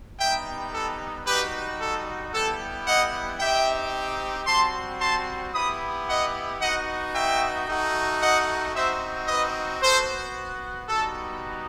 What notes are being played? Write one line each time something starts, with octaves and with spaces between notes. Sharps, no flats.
G3 B3 D#4 G4 E5 G5
A4
G3 D#4 F#4 G4 B4
A4
G3 B3 E4 G4 A4
D#5 F#5
C4 D#4 G4 E5 G5
G3 C4 F#4 A5 C6
A5 C6
B3 E4 G4 B5 D#6
D#5 F#5
B3 D#4 F#4 D#5 F#5
E5 G5
A3 D#4 F#4
D#5 F#5
C4 D#4 F#4 C5 E5
B4 D#5
B3 F#4 A4 C5
G3 B3 D#4 F#4 A4